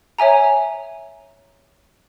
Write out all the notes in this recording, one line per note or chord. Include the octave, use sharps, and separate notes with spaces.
C#5 E5 G#5 A#5